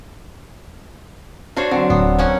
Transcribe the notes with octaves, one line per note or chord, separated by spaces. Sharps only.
D4 F4 F#4 C5 C#5 F5
D3 F#3 C4
D1 B3
A#3 C#4 F#5